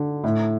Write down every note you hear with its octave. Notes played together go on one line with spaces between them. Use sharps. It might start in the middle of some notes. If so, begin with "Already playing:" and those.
Already playing: D3
A2